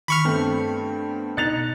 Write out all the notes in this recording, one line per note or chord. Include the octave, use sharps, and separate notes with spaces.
D#3 B5 C#6 F6
G2 A3 B3 C4 G5
B2 D#4 F#6 A6 C#7 F7